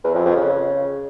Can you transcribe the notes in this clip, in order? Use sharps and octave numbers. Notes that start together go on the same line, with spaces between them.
E2
F2
F2
C#3